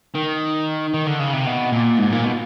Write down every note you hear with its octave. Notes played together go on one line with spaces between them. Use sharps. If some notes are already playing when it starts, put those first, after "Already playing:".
D#3
D#3
D3
C#3
C3
B2
A#2
G#2
A#2
B2